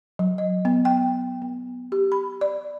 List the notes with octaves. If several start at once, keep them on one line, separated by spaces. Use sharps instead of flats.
F#3
D#5
B3
G5
B3
G4
B5
D5